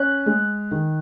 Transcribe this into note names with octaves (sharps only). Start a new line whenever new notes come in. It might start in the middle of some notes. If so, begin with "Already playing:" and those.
Already playing: C#4 F#6
G#3
D#3